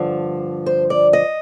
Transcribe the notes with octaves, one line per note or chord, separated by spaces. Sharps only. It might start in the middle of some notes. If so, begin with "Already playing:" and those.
Already playing: G2 D3 F3
C5
D5
D#5